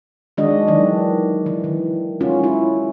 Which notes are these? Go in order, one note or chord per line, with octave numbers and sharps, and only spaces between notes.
D#3 G#3 D4 F#4 D#5
D#3 E3 F#3 D4
E3
D#3
G#3 C#4 F4 F#4
E4